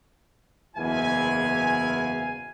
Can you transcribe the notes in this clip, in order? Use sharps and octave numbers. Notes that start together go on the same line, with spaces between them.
F#1 E2 G#2 E4 F5 G#5